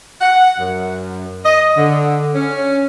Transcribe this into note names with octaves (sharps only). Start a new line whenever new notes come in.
F#5
F#2
D#5
D3
C#4